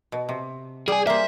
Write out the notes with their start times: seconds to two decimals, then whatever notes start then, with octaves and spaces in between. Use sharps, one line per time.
0.12 B2
0.29 C3
0.88 G3 G#4 G#5
1.07 A#3 C5 E5